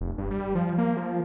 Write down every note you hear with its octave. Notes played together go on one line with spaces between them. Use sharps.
F1
G2
G3
F3
A#3
F3